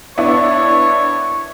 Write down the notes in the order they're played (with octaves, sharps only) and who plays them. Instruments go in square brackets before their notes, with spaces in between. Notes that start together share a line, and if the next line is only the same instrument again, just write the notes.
[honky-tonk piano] B3 D4 E4 [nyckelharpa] C#5